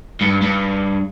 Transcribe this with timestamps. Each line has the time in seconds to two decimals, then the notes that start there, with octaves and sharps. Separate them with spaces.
0.21 G2
0.41 G2